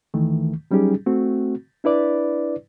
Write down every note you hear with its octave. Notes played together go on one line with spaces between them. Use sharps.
D2 D#3 E3 A3
F#3 G3 C#4 D#4 G4 G#4
A3 C4 F#4
D4 E4 B4 D5